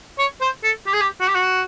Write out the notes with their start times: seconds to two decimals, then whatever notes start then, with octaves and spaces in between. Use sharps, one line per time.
0.19 C#5
0.41 C5
0.64 A4
0.87 G4
0.94 G#4
1.01 G4
1.21 F#4
1.28 G4
1.35 F#4